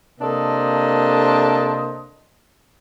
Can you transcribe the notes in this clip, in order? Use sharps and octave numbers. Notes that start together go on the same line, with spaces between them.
C3 A#3 D4 A4 C5 D#5